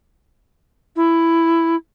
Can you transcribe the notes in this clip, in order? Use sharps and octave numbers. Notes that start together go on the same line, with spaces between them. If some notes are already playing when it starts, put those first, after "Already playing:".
E4